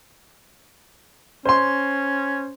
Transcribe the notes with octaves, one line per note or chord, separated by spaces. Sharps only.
C#4 C5 C6